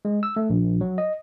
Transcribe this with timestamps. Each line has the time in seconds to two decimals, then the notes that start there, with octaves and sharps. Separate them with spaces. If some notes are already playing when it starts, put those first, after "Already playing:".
0.05 G#3
0.23 E6
0.36 A3
0.50 A#1
0.81 F#3
0.98 D#5